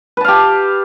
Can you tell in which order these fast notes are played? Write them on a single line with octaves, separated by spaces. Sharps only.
B4 A5 F5 G4